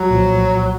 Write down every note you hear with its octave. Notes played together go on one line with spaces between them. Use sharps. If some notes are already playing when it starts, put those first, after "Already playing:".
Already playing: C2 F#3
A#2 F3